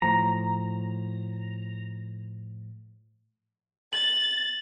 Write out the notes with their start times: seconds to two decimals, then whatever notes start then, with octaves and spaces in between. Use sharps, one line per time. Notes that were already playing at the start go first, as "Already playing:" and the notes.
0.02 A2 F3 A#5
3.93 A6 F#7